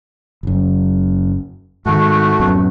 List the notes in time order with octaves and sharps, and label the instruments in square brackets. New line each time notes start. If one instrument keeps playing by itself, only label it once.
[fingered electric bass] F#1 F#2
[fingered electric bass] G#2 D#3 [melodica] A3 F#4
[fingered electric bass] D1 F#2 B3